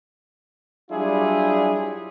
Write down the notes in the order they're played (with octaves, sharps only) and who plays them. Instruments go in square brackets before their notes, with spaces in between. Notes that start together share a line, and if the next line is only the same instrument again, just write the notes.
[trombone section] F#3 G3 D4 E4 F4 G#4